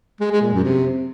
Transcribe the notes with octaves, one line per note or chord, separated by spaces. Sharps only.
G#3
G#3
A#2
F#2
C3